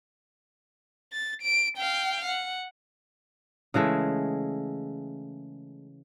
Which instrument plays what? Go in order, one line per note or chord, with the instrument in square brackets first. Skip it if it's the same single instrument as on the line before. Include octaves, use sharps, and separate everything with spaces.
[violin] A6
D7
F5 G5
F#5
[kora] C#3 E3 G#3 A3